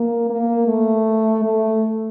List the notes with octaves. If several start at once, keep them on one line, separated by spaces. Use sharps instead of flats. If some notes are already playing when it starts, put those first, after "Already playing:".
Already playing: A#3
A#3
A3
A3